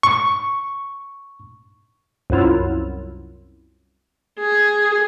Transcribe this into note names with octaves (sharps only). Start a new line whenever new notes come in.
C#6
C2 F#2 F#3 E4 F4
G#4